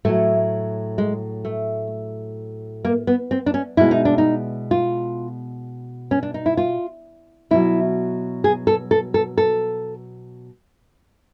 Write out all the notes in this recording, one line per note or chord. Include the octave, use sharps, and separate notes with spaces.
A2 F#3 A3
G#3
A3
A#3
B3
C4
D4
C#4
B2 G#3 E4
D#4
D4
D#4
F4
C#4
D4
D#4
E4
F4
B2 F#3 E4
G#4
A4
A4
A4
A4